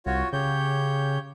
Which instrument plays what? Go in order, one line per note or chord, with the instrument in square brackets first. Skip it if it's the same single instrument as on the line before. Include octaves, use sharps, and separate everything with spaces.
[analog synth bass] C2 [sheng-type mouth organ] F4 F#4 C#5
[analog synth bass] C#3 [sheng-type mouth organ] G4 C#5 G6